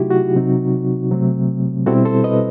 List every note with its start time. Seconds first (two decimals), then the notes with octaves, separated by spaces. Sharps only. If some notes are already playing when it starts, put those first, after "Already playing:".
Already playing: C3 F#3 A3 D#4 E4 F#4 G4
0.10 F#4
0.35 C3 F#3 C4 D#4
1.11 C3 F#3 A3 C4
1.86 B2 G3 C4 E4 F#4 A4
2.05 A4 C5
2.24 B4 D#5